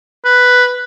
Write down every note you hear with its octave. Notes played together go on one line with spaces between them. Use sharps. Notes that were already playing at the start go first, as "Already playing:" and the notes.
B4